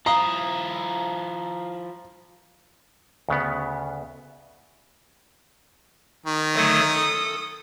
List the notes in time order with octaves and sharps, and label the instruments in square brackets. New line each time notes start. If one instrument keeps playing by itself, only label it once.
[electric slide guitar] F3 E4 [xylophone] F5 D#6 G7 [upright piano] A#5
[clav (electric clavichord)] D2 C#3 B3
[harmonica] D#3
[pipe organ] D3 F#3 A3 [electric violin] D#6
[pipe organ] A4